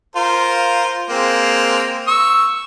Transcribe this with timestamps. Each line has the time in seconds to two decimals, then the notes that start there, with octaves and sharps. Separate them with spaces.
0.16 F4 A#4 C5
1.10 G#3 A#3 C4
2.07 C#6 E6